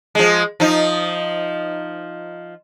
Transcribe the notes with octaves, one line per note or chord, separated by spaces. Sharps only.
F3 G#3
F3 D#4